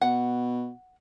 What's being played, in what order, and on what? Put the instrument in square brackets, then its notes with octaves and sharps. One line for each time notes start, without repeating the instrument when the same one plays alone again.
[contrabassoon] B2 [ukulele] F#5